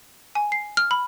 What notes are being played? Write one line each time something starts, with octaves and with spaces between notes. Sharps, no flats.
G#5
C7
F6
B5